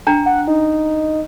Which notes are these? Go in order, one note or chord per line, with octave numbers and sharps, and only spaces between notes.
D4 G5 A#5
F#5
D#4